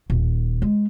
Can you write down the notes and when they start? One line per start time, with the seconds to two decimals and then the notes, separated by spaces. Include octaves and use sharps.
0.10 D#1
0.62 G#3